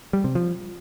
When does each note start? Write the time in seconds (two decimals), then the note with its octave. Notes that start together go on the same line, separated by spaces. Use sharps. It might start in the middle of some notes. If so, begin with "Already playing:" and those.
0.13 G3
0.24 C3
0.35 F3